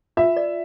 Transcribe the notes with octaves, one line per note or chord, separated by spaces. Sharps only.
F4 E5
D5